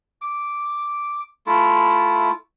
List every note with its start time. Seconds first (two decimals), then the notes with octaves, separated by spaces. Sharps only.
0.21 D6
1.46 A3 E4 F4